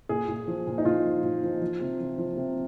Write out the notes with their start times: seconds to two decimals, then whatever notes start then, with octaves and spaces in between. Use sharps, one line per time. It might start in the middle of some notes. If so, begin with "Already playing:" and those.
0.09 A#2 G#4
0.28 A#2
0.48 F3
0.67 A#2
0.78 D#4
0.85 A#2 F4
1.05 F3
1.23 A#2
1.43 F3
1.62 F3
1.81 C3
2.00 F3
2.18 F3
2.37 C3